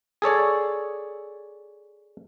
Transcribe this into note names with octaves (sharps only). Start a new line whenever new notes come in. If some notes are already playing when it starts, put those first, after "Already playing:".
G#4 A4 C#5 D5